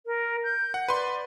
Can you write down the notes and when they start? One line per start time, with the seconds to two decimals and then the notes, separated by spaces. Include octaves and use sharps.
0.06 A#4
0.44 G6
0.74 F#5
0.88 B4 D5 C6